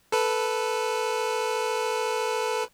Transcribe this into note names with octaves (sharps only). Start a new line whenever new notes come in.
A4 B4